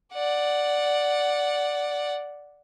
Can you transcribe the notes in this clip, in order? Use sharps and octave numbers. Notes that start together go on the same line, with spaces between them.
D5 F#5